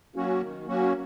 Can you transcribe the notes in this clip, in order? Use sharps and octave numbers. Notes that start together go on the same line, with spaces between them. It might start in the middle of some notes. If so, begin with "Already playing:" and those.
F#3 A#3 C#4 F#4
D#3
F#3 A#3 C#4 F#4